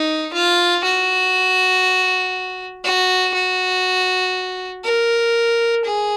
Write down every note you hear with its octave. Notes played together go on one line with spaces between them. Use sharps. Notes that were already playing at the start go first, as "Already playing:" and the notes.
Already playing: D#4
F4
F#4
F#4
F#4
A#4
G#4